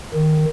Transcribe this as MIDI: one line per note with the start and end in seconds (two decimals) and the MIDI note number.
0.14 0.45 51